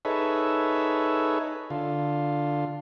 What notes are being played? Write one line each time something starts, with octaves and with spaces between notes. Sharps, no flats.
D#4 G#4 A4 B4 C#5 E5
D3 F4